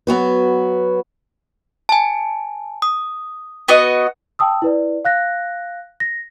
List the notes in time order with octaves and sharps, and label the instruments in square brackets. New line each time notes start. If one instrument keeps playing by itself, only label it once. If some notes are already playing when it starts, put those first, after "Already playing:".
[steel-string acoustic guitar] F#3 B3 F#4 B4
[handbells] G#5 A5
D#6
[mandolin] B3 F#4 D#5
[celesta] G5 A5 D#6 E6
E4 B4 D5
F5 F#6 A#6
A#6